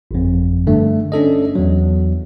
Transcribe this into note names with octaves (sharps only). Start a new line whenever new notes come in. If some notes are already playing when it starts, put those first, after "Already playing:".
G1 F2
G2 D3 A3
C#4 D4 A4 D#5
E2 F#3